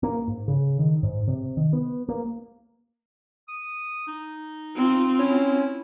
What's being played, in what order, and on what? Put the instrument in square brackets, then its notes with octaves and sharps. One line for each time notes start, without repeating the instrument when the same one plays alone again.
[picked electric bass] A#3
G#2
C#3
D#3
G#2
C3
D#3
B3
A#3
[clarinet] D#6
D#4
[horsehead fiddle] C4 F4
[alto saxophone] C#4 [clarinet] E4